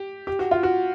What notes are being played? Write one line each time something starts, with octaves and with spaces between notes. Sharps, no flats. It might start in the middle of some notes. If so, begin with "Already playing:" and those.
Already playing: G4
G4
F#4
F4
F#4